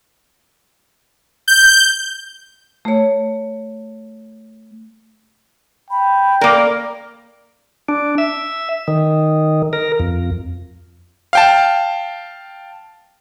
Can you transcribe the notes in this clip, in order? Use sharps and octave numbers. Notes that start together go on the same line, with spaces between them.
G6
A3 C#5
G5 B5
A#3 A#4 D5
D4
E5
D#3
A#4
F2
F5 G5 A5